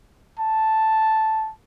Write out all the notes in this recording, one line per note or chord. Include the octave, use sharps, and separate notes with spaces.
A5